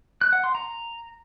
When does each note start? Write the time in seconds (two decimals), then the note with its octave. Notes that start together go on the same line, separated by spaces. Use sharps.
0.21 F#6
0.33 F#5
0.44 C6
0.55 A#5